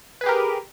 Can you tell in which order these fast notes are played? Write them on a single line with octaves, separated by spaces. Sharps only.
B4 G#4 G4 A#4